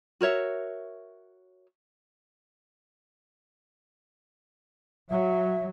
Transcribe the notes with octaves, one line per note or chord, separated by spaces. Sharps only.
F#4 A#4 C#5 E5
F#3 E5